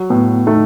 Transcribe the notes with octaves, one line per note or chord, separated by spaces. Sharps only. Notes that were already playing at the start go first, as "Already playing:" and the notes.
Already playing: F#3
A2 B3
A3 D#4